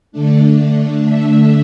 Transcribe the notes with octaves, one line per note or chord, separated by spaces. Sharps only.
D3 A3 D4
E5